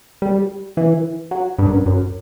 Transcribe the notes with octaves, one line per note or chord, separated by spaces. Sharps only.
G3
E3
F#3
G2
F#2
G2
F#2